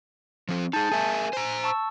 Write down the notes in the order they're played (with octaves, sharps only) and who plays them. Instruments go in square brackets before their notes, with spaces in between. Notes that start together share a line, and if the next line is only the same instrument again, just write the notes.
[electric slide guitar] F3 C4
[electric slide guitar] D#4 G#4 [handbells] A5 G6 A6
[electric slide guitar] G#4 A#4 E5 [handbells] G#5
[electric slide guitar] C5 A#5
[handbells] A5 C#6 E6